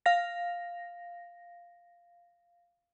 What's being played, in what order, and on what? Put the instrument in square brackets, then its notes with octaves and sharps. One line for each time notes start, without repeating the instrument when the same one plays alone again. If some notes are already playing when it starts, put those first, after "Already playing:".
[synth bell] F5 A#6